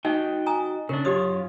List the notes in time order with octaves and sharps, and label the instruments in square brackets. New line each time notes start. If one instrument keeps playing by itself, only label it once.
[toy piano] D#4 [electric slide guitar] F#4 D#5 G5
[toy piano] G#5 A#5 D#6
[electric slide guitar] C#3 D4 [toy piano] A#4
[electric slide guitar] F#2 F4 C#5 [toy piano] G4 D#6